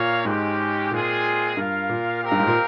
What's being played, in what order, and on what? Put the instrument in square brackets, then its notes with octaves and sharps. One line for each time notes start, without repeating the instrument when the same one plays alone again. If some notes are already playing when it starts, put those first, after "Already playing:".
Already playing: [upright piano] A#2 [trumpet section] A#3 C#5 F5
[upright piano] G#2 [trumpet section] G#3 C#4 G4
[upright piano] A#2 [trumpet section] G#3 C4 F4 G#4
[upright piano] G2 [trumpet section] F4 A#4 F5
[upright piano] A#2
[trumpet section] C4 G4 A#4 F5
[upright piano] G2
G#2
A#2